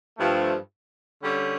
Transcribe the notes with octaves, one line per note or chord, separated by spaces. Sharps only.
G2 F3 A3
D3 G3 C#4 G4 C#5